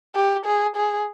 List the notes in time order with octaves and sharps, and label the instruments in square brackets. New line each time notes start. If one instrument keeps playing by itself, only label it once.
[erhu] G4
G#4
G#4